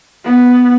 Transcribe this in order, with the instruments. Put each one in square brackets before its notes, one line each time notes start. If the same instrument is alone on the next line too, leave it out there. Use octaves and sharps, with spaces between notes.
[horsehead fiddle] B3